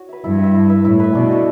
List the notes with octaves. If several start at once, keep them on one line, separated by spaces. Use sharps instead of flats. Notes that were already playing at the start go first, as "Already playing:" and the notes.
Already playing: F#4 C#5
B4 E5
G2 E4
B4 E5
E4
B4 E5
A2 E4
B4 E5
B2 D4
F#4 A4 C#5